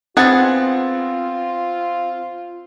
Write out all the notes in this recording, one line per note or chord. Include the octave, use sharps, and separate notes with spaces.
B3 C4 F4 G#4 F#5 A6